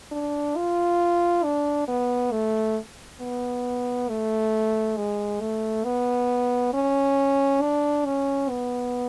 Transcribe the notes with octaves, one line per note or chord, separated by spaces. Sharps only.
D4
F4
D4
B3
A3
B3
A3
G#3
A3
B3
C#4
D4
C#4
B3